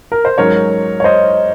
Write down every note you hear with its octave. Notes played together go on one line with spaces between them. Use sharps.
A#4
C5
G#2 F#3 C#4 A#4 C#5
C#5
C5 D#5